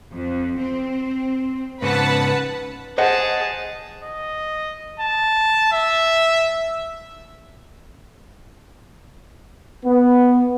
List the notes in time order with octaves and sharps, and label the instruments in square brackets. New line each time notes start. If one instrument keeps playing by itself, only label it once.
[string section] F2
C4
[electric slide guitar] G#2 C#3 [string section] B4 F#5 A5
[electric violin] G#4 A5 [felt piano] C5 D#5 F#5
[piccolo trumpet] D#5
A5
E5
[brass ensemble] B3